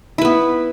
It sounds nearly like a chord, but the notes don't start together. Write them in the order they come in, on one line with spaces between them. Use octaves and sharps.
E4 B4 B3